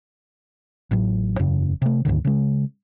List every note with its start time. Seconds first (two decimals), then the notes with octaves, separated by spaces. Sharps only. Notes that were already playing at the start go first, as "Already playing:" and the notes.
0.91 A1 A2 F#3
1.39 E1 F#2 C#3
1.82 C3 A3
2.05 D2 G#2 D3 D#3
2.25 C#3 G#3